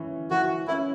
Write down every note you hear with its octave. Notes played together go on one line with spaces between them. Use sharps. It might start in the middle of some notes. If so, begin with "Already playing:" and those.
Already playing: E3 C#4
E3 F#4
C#4 E4